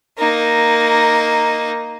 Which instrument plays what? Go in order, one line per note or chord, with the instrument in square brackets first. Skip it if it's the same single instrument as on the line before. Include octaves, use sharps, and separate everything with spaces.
[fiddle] A#3 D#4